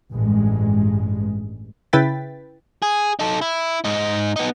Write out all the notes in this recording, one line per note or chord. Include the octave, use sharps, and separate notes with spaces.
A1 G2 G#3
C#3 E4 B4 G5 A6 B6
G#4
D#4 A4
E4
G#2 D#4
B3 D#4